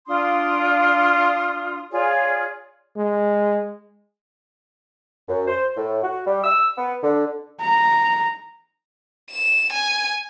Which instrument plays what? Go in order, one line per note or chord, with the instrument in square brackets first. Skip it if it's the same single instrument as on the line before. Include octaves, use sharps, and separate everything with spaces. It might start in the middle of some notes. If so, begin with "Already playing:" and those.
[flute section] D4 F4 C6 D#6
F4 G#4 C#5 D5
[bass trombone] G#3
[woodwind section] F#2
C5
A2
F#4
G3
E6
B3
D3
[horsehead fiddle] A#5
[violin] E7
G#5